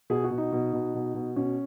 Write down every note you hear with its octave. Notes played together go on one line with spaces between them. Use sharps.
B2 G#4
F#4
B2
D#4
B2
B2
B2
B2
B2 C#4